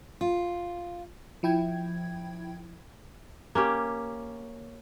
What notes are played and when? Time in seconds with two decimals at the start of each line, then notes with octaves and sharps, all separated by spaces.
0.21 F4
1.43 F3 E4 G5 G#6
3.55 A#3 C#4 G4